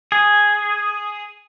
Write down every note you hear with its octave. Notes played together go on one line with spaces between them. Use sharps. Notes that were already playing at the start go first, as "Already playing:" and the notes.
G#4